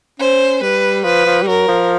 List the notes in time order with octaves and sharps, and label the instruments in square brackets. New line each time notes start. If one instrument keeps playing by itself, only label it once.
[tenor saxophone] C#4 [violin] C5
[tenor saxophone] G3 [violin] B4
[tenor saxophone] F3 [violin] B4
[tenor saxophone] F3
G3
[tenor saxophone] F#3 [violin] A#4
[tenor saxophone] F3